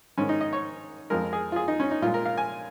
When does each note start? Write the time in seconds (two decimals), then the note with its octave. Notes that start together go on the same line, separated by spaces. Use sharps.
0.18 G#2 D#3 G#3 C#4
0.29 D#4
0.41 D#5
0.53 C#5
1.10 F2 F3 G#3 A#4
1.33 G#4
1.52 F4
1.56 G#4
1.68 D#4
1.80 C#4
1.91 D#4
2.02 A#2 F4
2.06 G#3
2.14 A#4
2.26 F5
2.38 G#5